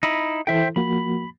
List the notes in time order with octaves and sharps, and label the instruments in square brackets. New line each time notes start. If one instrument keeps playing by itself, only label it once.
[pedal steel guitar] D#4 E4 B5
[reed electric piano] E3 E4 A4 [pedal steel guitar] C5 E5 G5
[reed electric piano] F3 A#3 F#4 [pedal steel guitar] B5